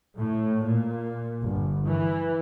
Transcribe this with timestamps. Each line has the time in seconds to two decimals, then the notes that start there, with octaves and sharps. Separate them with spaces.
0.17 A2
0.63 A#2
1.44 G1
1.85 E3